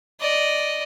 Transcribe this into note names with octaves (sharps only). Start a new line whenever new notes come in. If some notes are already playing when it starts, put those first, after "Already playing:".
D5 D#5